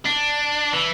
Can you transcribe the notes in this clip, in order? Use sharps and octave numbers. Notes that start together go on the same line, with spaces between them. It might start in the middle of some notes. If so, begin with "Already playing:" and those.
D4
E3